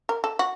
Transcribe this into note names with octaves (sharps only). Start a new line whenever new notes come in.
A#4
A4
F#4